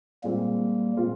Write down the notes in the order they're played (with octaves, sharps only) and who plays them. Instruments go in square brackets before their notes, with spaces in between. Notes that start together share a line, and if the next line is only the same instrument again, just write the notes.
[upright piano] A#2 G#3 C4 F4 [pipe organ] G3 A#3
[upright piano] A#2 G#3 C4 F4